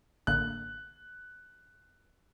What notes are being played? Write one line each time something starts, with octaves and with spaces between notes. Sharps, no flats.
A1 D3 A#3 F#6